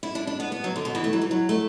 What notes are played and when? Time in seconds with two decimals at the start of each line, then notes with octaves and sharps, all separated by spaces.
0.03 E4
0.15 D4
0.27 D4
0.40 B3
0.52 B3
0.64 F#3
0.76 D3
0.85 B2
0.95 E3
1.04 A3
1.13 F#3
1.22 E3
1.31 F#3
1.49 A3